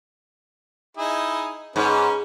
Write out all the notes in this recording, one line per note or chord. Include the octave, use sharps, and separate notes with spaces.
D#4 E4 G#4
G#2 C#4 B4